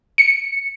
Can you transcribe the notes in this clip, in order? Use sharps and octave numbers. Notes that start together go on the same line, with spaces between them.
C#7